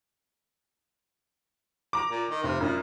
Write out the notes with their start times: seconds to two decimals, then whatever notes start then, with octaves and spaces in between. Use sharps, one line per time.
1.93 A#5 D6
2.10 A#2
2.30 D#3
2.43 F1 C3
2.61 F#2 A#2